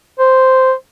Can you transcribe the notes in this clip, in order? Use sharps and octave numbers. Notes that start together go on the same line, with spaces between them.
C5